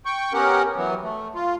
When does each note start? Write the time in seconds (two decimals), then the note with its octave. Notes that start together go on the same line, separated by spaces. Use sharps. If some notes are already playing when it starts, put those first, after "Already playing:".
0.06 G5 C#6
0.33 B3 C#4 G4 A#4 F#5
0.76 E3 F#3 B3
1.03 A3
1.35 F4